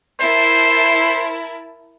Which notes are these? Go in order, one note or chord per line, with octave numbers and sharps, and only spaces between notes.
E4 A#4 C5 A5